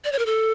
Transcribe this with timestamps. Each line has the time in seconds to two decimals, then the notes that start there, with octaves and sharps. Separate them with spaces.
0.04 D5
0.12 C#5
0.19 A#4
0.26 A4